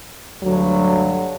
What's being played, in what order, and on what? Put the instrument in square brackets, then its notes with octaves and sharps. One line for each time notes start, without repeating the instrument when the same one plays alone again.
[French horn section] D2 G2 D3 F#3